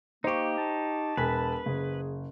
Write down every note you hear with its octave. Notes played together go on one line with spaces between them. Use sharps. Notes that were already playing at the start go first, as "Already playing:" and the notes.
A#3 D#4 G4 C5 C#6
A5
E1 B4 G#5 B6
F#1 G#4